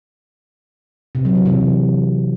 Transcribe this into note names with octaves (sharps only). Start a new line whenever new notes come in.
C3
F#3
E3
C3